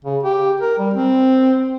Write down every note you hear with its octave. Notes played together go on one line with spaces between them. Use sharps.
C#3
G4
A#4
G3
C4